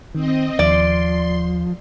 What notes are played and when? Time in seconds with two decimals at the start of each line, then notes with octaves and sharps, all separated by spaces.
0.15 D#3 C4 D#5
0.59 D#2 F3 D5 C6